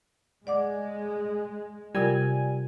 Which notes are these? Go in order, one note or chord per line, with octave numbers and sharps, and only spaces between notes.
G#3 D5 F#5 D6
C3 G3 F4 A#4 G#5